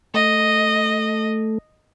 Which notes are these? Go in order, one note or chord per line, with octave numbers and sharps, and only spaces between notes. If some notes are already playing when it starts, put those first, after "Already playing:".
A3 D#5